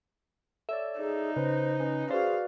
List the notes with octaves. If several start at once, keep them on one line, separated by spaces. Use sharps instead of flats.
A4 C#5 D5 E5
D#4 G#4
C#3 B4 C5
C#4 B4
F#4 G#4 B4 C5 D5 F5